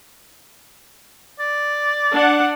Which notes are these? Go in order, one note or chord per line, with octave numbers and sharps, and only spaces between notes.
D5
D4 F#5